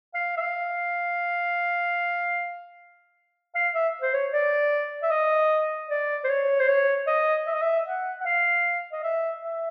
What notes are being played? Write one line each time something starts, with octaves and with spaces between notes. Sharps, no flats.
F5
E5
F5
F5
E5
C5
C#5
D5
E5
D#5
D5
C5
C#5
C5
C#5
D#5
E5
D#5
E5
F#5
F#5
F5
D#5
E5
E5